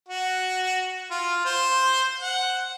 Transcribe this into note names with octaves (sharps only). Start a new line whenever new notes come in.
F#4
F4
C5
F#5